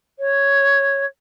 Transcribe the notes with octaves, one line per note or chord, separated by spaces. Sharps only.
C#5